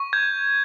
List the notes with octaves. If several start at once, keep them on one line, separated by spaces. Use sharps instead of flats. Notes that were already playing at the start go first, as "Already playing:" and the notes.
Already playing: C#6
G6 G#6